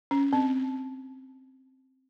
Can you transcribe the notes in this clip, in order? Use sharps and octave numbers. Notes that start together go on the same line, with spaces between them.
C#4
C4